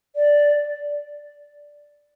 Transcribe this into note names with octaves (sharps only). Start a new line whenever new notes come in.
D5